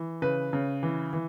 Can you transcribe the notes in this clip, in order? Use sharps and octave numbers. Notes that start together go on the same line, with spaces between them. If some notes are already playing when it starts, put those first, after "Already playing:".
Already playing: E3
C#3 B4
C#3
E3
E3